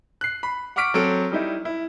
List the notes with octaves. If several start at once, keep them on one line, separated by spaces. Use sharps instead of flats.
F#6 C7
B5
F#5 C#6 D6 F6 B6 D7
F#3 C4 A4 D7
G3 D#4 E4
E4